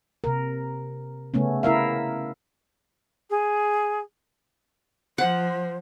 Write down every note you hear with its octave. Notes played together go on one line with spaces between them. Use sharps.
C3 A#4
C#3 A3 B3 C#4
E4 A#4 E5 F5
G#4
F3 C5 F#5